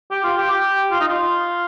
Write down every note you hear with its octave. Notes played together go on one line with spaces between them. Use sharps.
G4
F4
G4
G4
F4
D#4
F4